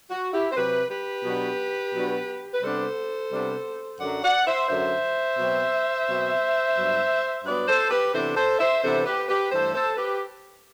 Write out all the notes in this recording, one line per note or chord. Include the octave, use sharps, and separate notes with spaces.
F#4
E4 G4
C5
C3 F#3 C4 G4 B4
G4 B4
B2 F#3 B3 D4
B2 F#3 B3 D4
B4
C3 G3 B3 D4 A4 C5
C3 G3 B3 D4
F#2 D3 F#3 D5 F#5
D5 F#5
C5 E5
F#2 D3 F#3 C5 E5
B2 F#3 C4
B2 F#3 C4
G2 F#3 B3
G2 F#3 B3 B4 D5
A4 C5
G4 B4
C3 E3 B3 D4 A4 C5
A4 C5
C5 E5
C3 E3 B3 D4 A4 C5
G4 B4
G4 B4
G2 E3 A3 A4 C5
A4 C5
G4 B4